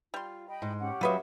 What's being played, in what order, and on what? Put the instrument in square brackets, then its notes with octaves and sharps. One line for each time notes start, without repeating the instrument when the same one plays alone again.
[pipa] G3 C6 [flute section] F4
[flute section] D#5 G5 B5
[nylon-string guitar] G#2
[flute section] C#4 G4 F#5
[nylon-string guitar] F#3 E5 [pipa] F4 B4 D#5